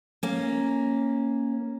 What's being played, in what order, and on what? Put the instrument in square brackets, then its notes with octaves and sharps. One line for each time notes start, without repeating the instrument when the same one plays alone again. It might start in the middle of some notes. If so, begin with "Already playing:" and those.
[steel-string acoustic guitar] A#3 C#4